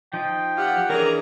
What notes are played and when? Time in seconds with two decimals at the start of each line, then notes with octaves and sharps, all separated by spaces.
0.13 F3 D#4 G5
0.57 F4 G4 F#5
0.89 E3 C#4 D4 G#4 A#4 A#5